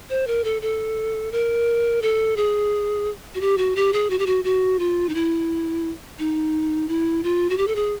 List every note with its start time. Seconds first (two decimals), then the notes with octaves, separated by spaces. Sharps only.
0.10 C5
0.27 A#4
0.44 A4
0.62 A4
1.32 A#4
2.02 A4
2.37 G#4
3.35 F#4
3.41 G4
3.58 F#4
3.76 G4
3.93 G#4
4.10 F#4
4.19 G4
4.26 F#4
4.44 F#4
4.79 F4
5.09 D#4
5.15 E4
6.19 D#4
6.88 E4
7.23 F4
7.50 F#4
7.57 G4
7.67 A4
7.75 G#4